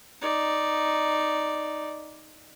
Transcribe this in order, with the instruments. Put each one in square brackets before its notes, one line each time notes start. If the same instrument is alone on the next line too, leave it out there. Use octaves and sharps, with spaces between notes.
[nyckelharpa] D#4 D5